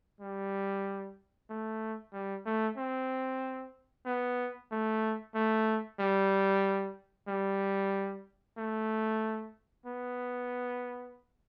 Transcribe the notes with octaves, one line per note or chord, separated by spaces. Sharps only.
G3
A3
G3
A3
C4
B3
A3
A3
G3
G3
A3
B3